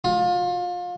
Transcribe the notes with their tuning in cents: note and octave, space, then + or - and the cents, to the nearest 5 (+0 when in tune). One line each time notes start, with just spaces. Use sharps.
F4 +30